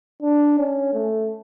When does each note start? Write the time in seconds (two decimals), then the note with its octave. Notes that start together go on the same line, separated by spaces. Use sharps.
0.22 D4
0.59 C#4
0.93 A3